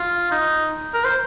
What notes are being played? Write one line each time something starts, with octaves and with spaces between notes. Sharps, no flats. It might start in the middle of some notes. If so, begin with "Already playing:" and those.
Already playing: F4
D#4
A#4
C5